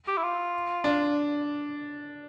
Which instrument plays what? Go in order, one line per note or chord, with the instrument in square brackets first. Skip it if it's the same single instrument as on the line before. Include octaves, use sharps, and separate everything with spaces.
[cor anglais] G4
E4
F4
[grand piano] D4